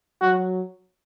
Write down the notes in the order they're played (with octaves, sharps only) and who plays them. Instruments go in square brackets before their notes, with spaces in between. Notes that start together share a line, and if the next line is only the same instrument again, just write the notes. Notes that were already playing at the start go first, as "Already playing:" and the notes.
[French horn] F#3 [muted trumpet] F#4